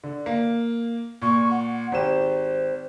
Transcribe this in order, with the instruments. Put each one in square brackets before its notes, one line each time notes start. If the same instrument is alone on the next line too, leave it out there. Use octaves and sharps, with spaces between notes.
[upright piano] D3
A#3
[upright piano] A#2 [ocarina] C#6
[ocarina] F#5
[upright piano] G#1 G4 E7 [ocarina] C5